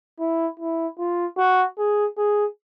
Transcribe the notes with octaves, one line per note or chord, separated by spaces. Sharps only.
E4
E4
F4
F#4
G#4
G#4